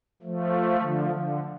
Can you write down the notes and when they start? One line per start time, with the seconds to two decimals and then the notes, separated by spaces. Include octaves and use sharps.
0.22 F3 A3
0.80 D3 F3
1.10 D3